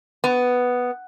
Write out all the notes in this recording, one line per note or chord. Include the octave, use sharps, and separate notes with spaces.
B3